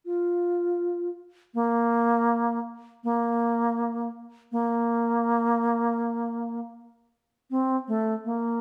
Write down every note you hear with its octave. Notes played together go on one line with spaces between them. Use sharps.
F4
A#3
A#3
A#3
C4
A3
A#3